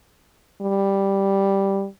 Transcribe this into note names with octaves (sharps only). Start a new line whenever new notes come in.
G3